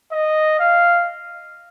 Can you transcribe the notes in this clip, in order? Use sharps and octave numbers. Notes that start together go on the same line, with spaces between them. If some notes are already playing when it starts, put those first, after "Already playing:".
D#5
F5